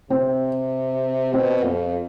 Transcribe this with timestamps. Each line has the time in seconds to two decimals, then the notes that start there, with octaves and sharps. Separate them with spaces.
0.10 C3 C4
1.33 B2 C4
1.65 F2